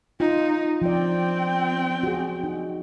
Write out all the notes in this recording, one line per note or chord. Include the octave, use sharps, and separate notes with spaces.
D#4 F4
F3 C4 D5 G5
F#4 G#4
D#4